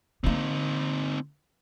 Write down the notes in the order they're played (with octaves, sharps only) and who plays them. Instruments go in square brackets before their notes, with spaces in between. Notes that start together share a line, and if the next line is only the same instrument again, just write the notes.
[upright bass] D3 A#3 [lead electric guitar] C4 D#4